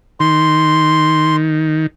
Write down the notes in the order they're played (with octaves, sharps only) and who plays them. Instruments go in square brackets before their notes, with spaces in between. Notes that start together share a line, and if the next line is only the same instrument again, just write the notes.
[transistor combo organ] D#3 [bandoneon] C6